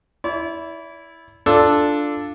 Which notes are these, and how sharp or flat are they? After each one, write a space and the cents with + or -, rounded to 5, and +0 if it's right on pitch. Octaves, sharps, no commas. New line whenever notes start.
E4 +0 D5 -40
D4 +0 F4 +0 A4 +0